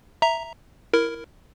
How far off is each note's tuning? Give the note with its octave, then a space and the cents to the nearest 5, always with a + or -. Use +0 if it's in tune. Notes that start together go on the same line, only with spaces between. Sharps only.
E5 +0 A#5 +0
E4 +10 A#4 +0